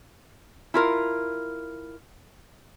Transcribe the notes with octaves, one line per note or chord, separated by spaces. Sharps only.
E4 F4 A#4